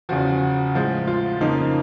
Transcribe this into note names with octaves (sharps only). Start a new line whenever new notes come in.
E2 C#3 F3 F#4
A2 F3 G#3
F4
F2 C#3 F3 A#3 D#4